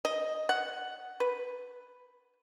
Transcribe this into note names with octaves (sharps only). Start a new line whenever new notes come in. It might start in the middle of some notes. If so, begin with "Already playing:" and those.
D#5
F#5
B4